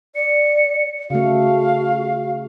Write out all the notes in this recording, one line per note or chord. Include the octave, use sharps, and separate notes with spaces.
D5 C#7
C#3 A3 F#4 F5